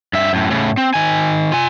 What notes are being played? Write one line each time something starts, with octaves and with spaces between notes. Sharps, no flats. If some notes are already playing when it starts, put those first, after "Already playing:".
G2 E5
F#2 A2
A2 C#3
C4
D#3 G#5
F4 G#5